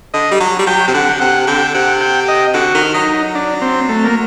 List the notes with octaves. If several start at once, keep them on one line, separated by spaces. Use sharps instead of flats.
D3 D#5
G3
F#3
G3
F#3 G5
C3
D3 F#5
C3 F#5
D3 G5
C3 F#5
G5
D#5
D3 F#4
D#3
F#3 D#4
F#3
D4
C4
A3
A#3